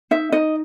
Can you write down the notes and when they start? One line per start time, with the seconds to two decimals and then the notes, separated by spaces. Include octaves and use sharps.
0.11 D#4 E5
0.32 D#4 D#5